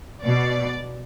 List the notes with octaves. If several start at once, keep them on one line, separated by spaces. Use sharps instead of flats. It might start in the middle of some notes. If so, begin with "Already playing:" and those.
B2 D5